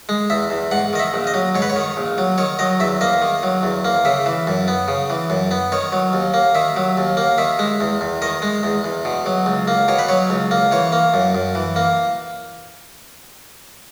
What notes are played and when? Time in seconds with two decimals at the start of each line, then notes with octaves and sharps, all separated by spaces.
0.09 G#3
0.30 E2 E5
0.50 E2
0.71 G#2 F#5
0.93 D#3 D#5
1.00 E5
1.14 A#1
1.27 D#5
1.34 F#3
1.55 G#2 C#5
1.62 B4
1.70 C#5
1.76 D#3
1.97 A#1
2.18 F#3
2.38 D#3 C#5
2.59 F#3 D#5
2.80 E2 E5
3.01 A#3 D#5
3.22 D#3
3.43 F#3
3.63 E2
3.85 A#3
4.05 C#3 E5
4.26 E3
4.47 F#2
4.68 B3
4.88 C#3
5.10 E3
5.30 F#2
5.51 B3
5.72 D#3 C#5
5.92 F#3
6.13 D#2
6.34 A#3
6.55 D#3 E5
6.76 F#3
6.97 D#2
7.17 A#3
7.38 D#3 E5
7.59 G#3
7.81 E2
8.01 E2
8.22 D#3 D#5
8.42 G#3
8.63 E2
8.84 E2
9.05 B2
9.26 F#3
9.46 C#2
9.68 A#3
9.88 B2 C#5
9.99 B4
10.09 F#3 C#5
10.30 C#2
10.51 A#3
10.71 E3 C#5
10.92 A#3
11.14 F#2
11.35 F#2
11.55 E3
11.76 A#3